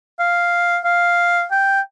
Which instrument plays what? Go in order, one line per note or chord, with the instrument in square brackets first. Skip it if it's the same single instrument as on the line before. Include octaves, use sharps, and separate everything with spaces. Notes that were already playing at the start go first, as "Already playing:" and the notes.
[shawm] F5
F5
G5